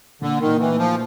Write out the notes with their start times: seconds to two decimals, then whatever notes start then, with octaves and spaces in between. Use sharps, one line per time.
0.21 A#2 D3
0.40 D#3
0.46 A#2
0.60 E3
0.72 A3
0.79 F3